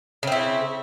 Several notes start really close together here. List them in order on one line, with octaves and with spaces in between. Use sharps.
C#3 C4 E4